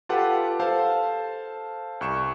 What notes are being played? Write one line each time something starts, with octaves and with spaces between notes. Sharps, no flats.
F4 G4 A4 B4 F#5 A5
A4 C5 F5 A5
C2 C#6 E7